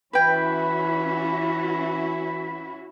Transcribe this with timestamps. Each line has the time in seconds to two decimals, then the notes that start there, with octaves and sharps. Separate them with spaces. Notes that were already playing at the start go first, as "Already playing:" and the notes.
0.13 E3 C#4 E4 F#4 B4 G5 B5